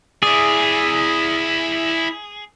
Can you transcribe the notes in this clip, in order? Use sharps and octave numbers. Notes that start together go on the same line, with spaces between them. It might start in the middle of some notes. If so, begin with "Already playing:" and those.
E4 G#4 D5